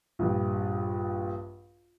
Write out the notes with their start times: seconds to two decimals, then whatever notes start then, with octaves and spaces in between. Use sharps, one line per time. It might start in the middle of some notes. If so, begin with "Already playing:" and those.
0.19 A#1 G2